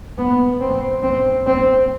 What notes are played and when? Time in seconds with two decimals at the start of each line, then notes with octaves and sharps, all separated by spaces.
0.18 B3
0.60 C4
1.03 C4
1.47 C4